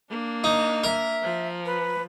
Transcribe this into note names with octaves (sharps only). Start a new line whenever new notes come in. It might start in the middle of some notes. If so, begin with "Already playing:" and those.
A#3 D4
D#4
A#4 E5
F3
B4